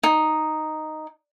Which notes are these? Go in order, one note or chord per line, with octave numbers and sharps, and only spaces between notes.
D#4